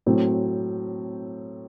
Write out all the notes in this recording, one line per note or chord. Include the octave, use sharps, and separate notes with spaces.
A2 F#3 C4